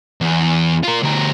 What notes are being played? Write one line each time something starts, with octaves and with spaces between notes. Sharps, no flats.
E2
F4 A#4
D2 A#4